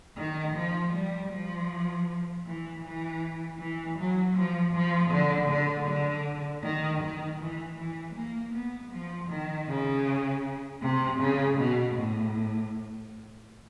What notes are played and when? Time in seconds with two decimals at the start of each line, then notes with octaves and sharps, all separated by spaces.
0.17 D#3
0.55 F3
0.93 G3
1.31 F3
2.45 E3
2.83 E3
3.59 E3
3.98 F#3
4.36 F3
4.74 F3
5.11 D3
5.49 D3
5.87 D3
6.63 D#3
7.01 D#3
7.40 E3
7.78 E3
8.15 A#3
8.54 B3
8.92 F3
9.29 D#3
9.68 C#3
10.81 C3
11.20 C#3
11.58 B2
11.96 A2